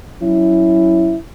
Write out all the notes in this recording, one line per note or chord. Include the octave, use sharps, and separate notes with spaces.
F#3 C#4 E4